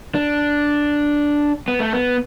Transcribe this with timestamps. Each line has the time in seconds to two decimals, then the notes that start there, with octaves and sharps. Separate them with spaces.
0.15 D4
1.68 B3
1.80 A3
1.93 B3